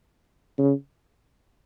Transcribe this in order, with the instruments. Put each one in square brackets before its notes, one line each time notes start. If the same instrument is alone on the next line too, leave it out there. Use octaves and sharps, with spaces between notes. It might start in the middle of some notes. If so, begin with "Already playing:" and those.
[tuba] C#3